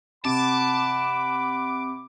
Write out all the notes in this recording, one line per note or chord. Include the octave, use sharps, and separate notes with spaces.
C3 F#5 A5 B5 D6